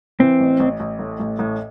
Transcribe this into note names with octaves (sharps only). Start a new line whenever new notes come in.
E3 C4
A1
A1
A1
A2
A1
A2